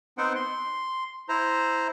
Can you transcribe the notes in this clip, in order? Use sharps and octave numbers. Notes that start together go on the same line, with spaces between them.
B3 C4 D#4 C5 F#5 G5
C6
E4 C5 A#5